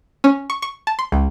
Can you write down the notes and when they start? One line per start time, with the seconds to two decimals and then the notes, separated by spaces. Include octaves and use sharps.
0.24 C#4
0.50 C#6
0.62 C#6
0.87 A5
0.99 C6
1.12 C#2